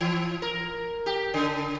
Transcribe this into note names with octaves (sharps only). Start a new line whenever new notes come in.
E3
A#4
G4
C#3